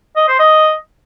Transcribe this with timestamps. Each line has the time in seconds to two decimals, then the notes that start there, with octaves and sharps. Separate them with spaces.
0.16 D#5
0.28 C5
0.39 D#5